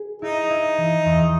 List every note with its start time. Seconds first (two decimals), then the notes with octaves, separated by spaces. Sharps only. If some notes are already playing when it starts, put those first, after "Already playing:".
Already playing: G#4
0.22 D#4 E4
0.50 E4
0.78 E3
1.06 E2